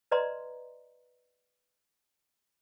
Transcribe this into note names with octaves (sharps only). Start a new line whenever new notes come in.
B4 D5 D#5 A#5 C6